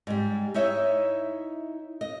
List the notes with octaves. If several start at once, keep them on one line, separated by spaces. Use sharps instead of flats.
G#2 G3
D#4 E4 C#5 D#5 E5
D#5